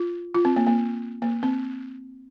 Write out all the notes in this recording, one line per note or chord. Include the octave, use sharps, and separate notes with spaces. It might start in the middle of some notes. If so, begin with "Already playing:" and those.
Already playing: F4
F4
C4
A#3
A#3
A#3
C4